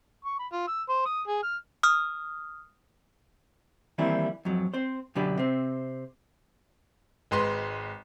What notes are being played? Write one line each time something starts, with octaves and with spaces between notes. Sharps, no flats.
C#6
B5
F4
E6
C5
D#6
G#4
F6
D#6 F6
D#3 E3 G3 A#3 C4 E4
F2 G#2 F#3
C4 C5
F#2 B2 D3 D4 G4 B4
C3 C4
G#1 G#3 B4 C6